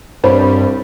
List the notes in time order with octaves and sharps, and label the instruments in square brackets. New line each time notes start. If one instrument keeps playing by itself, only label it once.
[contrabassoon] C2 [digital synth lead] G2 [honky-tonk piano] C5 C#5 B5